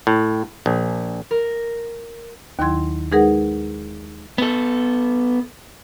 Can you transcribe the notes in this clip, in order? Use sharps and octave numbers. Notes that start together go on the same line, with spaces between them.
A2
A#1
A#4
D#2 D#3 F#3 E4 C6 G#6
G#3 D#4 G#4 A#4 B4 F#5
B3 A4